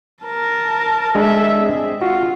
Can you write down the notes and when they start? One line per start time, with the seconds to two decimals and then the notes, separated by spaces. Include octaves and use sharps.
0.24 A#4 A5
1.15 G#3 D4 A4 E5 G#5
1.57 C4 G#4
2.01 F4 F#4